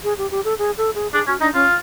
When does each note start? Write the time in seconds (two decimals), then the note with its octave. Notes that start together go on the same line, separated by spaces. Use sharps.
0.04 G#4
0.18 G4
0.31 G4
0.45 A4
0.59 G#4
0.78 A4
0.95 G#4
1.13 D4 G#4
1.27 C#4 F#4
1.41 D4 D#4
1.54 C#4 F4